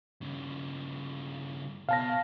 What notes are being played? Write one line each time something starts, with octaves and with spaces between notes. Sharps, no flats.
G2 C#3
B2 F5 A5 A#6